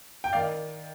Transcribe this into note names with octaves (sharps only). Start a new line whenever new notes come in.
G5
D#3 D5 F5